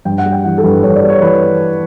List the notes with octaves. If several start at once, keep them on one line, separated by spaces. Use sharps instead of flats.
G2 G5
F#5
G3
G5
E3 F#5
A4
G2 B4
G2 C#5
D5
G3
C#5
E3 B4